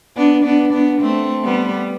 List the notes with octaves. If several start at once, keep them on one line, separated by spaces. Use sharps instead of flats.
B3 D4
B3 D4
B3 D4
A3 C4
G3 B3